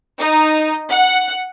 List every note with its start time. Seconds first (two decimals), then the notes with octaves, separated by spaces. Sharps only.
0.19 D#4
0.91 F#5